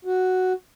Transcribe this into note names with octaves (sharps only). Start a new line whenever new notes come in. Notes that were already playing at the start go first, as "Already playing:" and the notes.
F#4